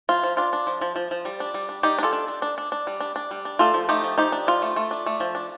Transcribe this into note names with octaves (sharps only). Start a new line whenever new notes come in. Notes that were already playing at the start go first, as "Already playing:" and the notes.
F3 F4
F3
D4 F4
D4
F3
F3
F3
F3
G3
D4
G3
D4
G3 D#4 G4
D4
F4 A4
D4
D4
D4
D4
D4
G3
D4
D4
G3
D4
A3 F4 A4
F3
A3 D#4 G4
F3
F3 D#4 G4
D4
F3 F4
A3
A3
D4
A3
F3
D4